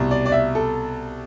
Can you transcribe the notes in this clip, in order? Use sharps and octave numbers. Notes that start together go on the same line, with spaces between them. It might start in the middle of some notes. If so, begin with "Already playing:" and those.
Already playing: C2 B2
D5
D5
E5
A4